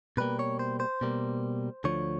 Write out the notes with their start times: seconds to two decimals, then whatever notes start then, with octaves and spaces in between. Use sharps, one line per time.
0.17 B2 G3 A#3 B4
0.39 C#5
0.59 C5
0.80 C5
1.01 B2 G3 A#3
1.84 D2 D3 F3 C#5